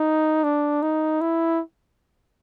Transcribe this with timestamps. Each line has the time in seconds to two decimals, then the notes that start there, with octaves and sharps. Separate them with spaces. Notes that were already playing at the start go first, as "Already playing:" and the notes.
Already playing: D#4
0.43 D4
0.82 D#4
1.21 E4